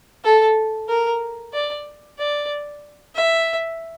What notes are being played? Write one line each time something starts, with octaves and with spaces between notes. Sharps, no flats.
A4
A#4
D5
D5
E5